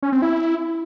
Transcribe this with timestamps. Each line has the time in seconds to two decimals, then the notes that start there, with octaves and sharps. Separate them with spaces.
0.03 C#4
0.12 C4
0.22 E4